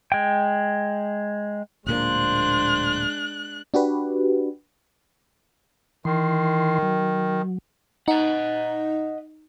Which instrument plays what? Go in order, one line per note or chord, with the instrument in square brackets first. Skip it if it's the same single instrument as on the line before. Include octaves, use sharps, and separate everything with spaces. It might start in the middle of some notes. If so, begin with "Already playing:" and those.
[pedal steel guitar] G#3 G5
[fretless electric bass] D1 A#2 A#3 [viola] G#3 D4 [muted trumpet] C5 [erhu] F#6
[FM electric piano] D4 F#4 G4 B4
[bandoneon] D#3 [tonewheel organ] E3 C6
[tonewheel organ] F#3
[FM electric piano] D#4 [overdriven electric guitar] D#5 F#5